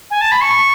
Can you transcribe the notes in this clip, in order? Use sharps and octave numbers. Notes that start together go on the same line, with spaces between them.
G#5
A5
B5
C#6